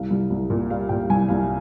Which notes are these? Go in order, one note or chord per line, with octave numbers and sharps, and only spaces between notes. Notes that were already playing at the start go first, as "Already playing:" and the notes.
Already playing: C2 F5
C2
C2
A#2
G3 F5
A#2 G5
C2 G#5
C2 F5